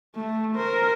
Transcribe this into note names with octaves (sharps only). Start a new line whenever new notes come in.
A3
A#4 C5